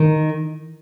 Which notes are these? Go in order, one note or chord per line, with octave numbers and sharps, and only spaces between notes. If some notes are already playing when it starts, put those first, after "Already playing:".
Already playing: D#3